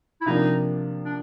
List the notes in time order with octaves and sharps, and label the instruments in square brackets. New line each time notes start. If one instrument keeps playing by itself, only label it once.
[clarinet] E4
[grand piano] C3 F3 A#3 D4 [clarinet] D#4
[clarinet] D4